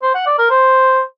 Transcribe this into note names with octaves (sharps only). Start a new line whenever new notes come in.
C5
F#5
D5
A#4
C5